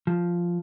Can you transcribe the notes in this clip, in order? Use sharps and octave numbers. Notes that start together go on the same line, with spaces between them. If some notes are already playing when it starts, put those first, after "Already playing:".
F3